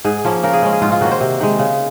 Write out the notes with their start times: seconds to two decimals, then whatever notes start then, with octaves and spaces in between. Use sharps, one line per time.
0.05 G#2 G#4
0.25 F3 A#3 C#4
0.43 C#3 A#4
0.53 G#4
0.62 G#3 C#4
0.72 G#4
0.82 G#2 F4
0.92 F4
1.01 D#3 A#3 C#4 F#4
1.11 C5
1.21 C3
1.40 D#3 G#3
1.59 C#3